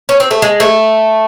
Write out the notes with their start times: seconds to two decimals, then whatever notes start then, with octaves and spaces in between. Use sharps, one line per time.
0.09 C#4
0.20 C4
0.31 A3
0.42 G#3
0.60 A3